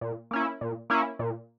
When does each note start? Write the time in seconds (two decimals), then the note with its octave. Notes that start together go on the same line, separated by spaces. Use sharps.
0.01 A#2
0.31 A#3 C#4 E4
0.61 A#2
0.90 A#3 C#4 E4
1.19 A#2